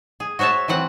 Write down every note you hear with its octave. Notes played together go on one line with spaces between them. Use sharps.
G#4
F#4 C5 C#5 E5 A5
E3 F#3 C4 F#5